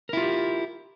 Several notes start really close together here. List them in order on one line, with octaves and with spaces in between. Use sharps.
A#4 E4 F4 G4